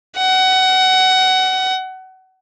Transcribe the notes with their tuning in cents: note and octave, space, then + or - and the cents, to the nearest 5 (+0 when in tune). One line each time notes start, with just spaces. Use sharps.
F#5 +25